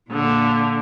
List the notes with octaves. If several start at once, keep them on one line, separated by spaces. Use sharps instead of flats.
A#2 D3